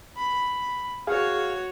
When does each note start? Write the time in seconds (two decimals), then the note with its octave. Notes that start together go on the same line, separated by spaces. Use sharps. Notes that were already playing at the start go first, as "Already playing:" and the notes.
0.17 B5
1.07 F#4 G#4 C#5 F5